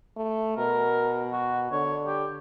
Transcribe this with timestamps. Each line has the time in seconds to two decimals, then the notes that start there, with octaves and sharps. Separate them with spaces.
0.17 A3
0.58 B2 A#4
1.33 F#4
1.72 D3 C#5
2.07 G4